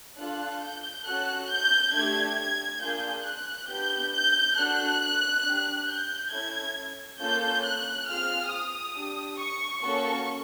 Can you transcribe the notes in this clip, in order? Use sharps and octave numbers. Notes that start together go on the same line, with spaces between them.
D4 F4 A4 F#6
G6
C#4 F#4 A4 F#6
G6
A3 D4 G4 G#6
G#6
A#3 D4 F4 G#4 G6
F#6
B3 D4 G4 G6
G6
D4 F#4 A4 F#6
D4 G4
G6
C#4 E4 A4 G#6
A#3 C#4 F4 A4 G6
F#6
C4 F4 G#4 F6
D#6
D4 G4
C#6
A#3 C#4 F#4 A4 C#6